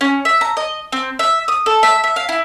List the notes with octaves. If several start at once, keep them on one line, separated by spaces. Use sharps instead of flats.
C#4
E5
A#5
D#5
C4
E5
D#6
A4
E5
E5
F5
E4